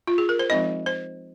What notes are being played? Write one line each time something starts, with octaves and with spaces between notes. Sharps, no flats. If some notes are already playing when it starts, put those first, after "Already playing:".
F4
G#4
A#4
C5
F3 G#3 C4 D#4 D#5
C5